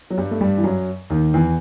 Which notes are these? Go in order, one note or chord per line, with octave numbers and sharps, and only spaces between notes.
F#3
G2 G3
A3
G2 G3
E3
F#2 F#3
D#2 D#3
E2 E3